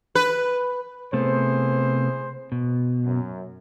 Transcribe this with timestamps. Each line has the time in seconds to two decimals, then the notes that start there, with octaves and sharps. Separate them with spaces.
0.15 B4
1.13 C3 A3 B3 E4 G#4 C5
2.52 B2
3.06 F#2